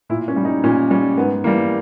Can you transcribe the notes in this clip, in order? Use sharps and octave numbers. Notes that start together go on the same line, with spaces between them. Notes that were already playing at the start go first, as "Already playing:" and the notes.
A#2 E4
C#4
G3
D#4
A#2 C#4
G3 C#4
G#2 B3
E3 G3 A#3